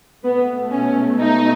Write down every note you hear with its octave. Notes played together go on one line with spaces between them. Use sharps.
B2 A3 B3
C#4
D#4